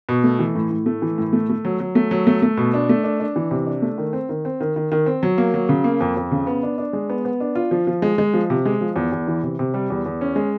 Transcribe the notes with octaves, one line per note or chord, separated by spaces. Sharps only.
B2
A3
E3
A2
A2
A3
E3
A2
A3
A3
F#3
F#3
A3
F#3
A3
A3
B2
D4
A3
D4
D4
E3
C3
D4
A3
D#3
C4
D#3
C4
D#3
D#3
D#3
C4
F#3
A#3
F#3
C#3
A#3
F2
F2
C#3
B3
D4
D4
G#3
B3
B3
D4
F4
F3
F3
G#3
G#3
F3
C3
G#3
F3
E2
E2
E3
C3
C3
G3
E2
E2
C#4
G#3